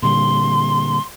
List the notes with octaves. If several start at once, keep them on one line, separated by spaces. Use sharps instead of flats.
A#2 D3 G3 C6